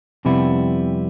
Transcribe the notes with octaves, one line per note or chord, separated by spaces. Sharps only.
F2 C3 G3 B3 E4